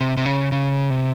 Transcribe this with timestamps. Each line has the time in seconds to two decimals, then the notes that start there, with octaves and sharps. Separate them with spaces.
0.01 C3
0.17 C3
0.26 C#3
0.52 C#3
0.90 C3